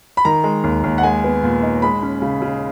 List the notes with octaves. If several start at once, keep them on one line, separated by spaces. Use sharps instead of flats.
B5
D#3 A#5
G#3
D#2
D#2
F#5
G#3 G#5
B3
A#2
D#4
G#3 B5
C#4
C#3
C#3